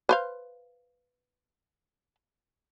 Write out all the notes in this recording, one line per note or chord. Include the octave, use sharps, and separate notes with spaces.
B4 C5 F5